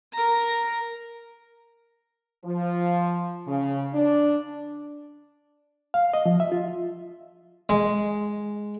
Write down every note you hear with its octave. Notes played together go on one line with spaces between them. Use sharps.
A#4 A#5
F3
C#3
D4
F5
D#5
F3
E5
F4
G#3